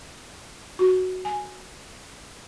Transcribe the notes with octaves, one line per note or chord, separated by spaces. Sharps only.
F#4
G#5